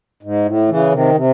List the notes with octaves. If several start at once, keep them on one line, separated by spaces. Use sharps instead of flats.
G#2
A2
C#3 E3
C3 D#3
C3